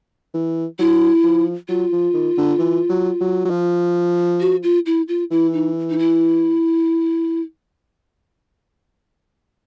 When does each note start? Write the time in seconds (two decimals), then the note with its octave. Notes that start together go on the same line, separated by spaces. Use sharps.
0.34 E3
0.79 F#3 E4
1.24 F3
1.69 F#3 F4
1.92 F3
2.14 D#3
2.38 D3
2.59 E3
2.89 F#3
3.20 F#3
3.45 F#3
3.50 F3
4.40 F#4
4.63 F4
4.86 E4
5.08 F4
5.31 E3 E4
5.54 D#4
5.90 D#4
5.98 E4